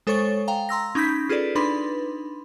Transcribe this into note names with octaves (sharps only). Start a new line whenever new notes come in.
G#3 A4 C5 C#5 C#6 A6
F5 G5 A#5
A#5 C6 E6 A#6
C#4 D#4 B5 G6 B6
F4 G#4 A4 B4 D5
D4 D#4 B4 B5 C6